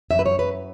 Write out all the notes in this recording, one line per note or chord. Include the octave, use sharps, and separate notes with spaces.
F#2 E5
B4
C#5
F#2 B4